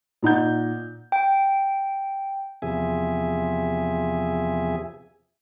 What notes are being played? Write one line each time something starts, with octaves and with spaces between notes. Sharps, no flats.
A#2 D#4 F#5 G6
G5
E2 C3 F3 G#4 E5 G#5